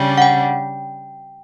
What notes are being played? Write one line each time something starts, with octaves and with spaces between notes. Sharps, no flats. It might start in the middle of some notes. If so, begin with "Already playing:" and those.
Already playing: C#3 G3 D4
F#5
G5